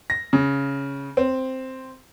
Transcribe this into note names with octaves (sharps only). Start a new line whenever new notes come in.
A#6
C#3
C4